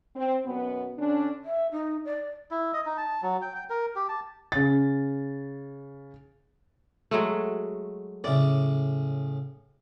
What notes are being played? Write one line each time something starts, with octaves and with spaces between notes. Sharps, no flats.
C4
F#2 B2 B3
D3 C#4 D4
E5
D#4
D5
E4
D#5
D#4
A5
F#3
G5
G5
A#4
G4
A5
C#3 A6
F#3 G#3 A3
A2 C#3 D5